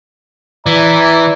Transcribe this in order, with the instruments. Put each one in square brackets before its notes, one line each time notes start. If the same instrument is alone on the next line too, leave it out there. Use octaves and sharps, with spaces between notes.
[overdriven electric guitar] E3 [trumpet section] D5 E5 A#5